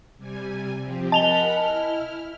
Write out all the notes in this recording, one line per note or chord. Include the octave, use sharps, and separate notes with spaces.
C3 G3 G#5
F3 C4 G4
A#4 D#5 F#5 G#5 A5 B5 F7 G7
E4 F6